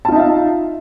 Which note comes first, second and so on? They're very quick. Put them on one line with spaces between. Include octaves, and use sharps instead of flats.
A5 F4 D#4 E5 F5